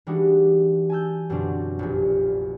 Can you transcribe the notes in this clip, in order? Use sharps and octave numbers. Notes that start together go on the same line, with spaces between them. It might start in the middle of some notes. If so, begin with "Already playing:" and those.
E3 G3 G#3 D4 D#4 F#4
G#5 A5 E6 G6
F#2 B2 D3 F#3 C4 D4
F1 A#1